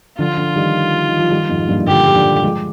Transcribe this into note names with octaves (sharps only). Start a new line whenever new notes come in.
D3 F3 F4
D3 F3
D#3 G3
D#3
F3
D#3 G3
F2 G#2
G2 A#2
A#2 D3 G4
G3
D3 F3
F3 G#3